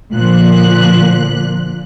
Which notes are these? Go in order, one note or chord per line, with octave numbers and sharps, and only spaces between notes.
A#2 D3 F3 F#6